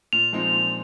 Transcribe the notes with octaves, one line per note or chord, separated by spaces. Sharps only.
A#2 F7
F3 G#3 C4 D#4
A#2